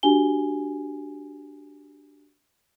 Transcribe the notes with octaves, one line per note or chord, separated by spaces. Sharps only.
D4 F#4 G4 G#5 G7